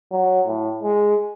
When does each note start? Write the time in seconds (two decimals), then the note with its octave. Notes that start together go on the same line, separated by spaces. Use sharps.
0.11 F#3
0.46 A2
0.83 G#3